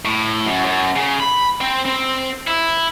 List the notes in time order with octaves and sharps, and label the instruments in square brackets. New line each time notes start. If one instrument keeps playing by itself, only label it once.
[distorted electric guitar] A2
F#2
F#2
C#3
B5
C4
C4
E4